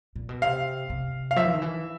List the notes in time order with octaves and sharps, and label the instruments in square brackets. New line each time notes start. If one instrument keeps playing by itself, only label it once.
[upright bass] A#2
B2
[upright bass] C3 [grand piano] F5
[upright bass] C3
[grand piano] F5
[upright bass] F3 [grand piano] E5
[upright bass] E3
D#3
E3